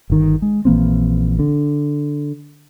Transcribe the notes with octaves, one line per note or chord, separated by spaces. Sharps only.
G1 D#3
G#3
A#1 E3 A#3 C4
D3